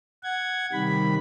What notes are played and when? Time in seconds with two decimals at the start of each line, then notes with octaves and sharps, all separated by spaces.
0.23 F#5 G#6
0.72 C3 D#3 G3 B5